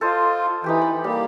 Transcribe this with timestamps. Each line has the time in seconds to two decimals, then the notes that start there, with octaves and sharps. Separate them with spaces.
0.01 F4 A4 C5 D#5
0.64 E3 D#4 G4 G5
0.82 B5
1.04 G3 A#3 G4